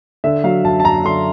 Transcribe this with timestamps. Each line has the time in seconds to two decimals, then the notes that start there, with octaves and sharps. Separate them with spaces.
0.24 D3 E5
0.44 F#3 F5
0.64 F#2 A5
0.80 A5
0.85 F#2 A#5
1.05 D3 C6